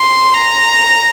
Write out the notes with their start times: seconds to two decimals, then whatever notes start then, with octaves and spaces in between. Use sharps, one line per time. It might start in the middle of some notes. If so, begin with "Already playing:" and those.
Already playing: C6
0.34 A#5